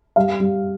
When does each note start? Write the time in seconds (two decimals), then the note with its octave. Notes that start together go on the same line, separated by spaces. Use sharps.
0.16 G3 F5
0.40 G3